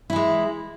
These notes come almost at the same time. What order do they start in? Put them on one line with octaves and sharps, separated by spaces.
E4 E3 G#3